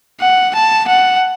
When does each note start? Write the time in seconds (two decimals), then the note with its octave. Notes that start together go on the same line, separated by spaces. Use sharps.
0.21 F#5
0.54 A5
0.88 F#5